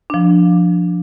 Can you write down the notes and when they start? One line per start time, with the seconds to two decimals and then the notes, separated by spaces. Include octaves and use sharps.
0.10 F3 D4